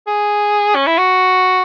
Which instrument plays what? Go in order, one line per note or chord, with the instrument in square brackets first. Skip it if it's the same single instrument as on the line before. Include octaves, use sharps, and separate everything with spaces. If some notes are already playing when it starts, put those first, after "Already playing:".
[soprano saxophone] G#4
C#4
E4
F#4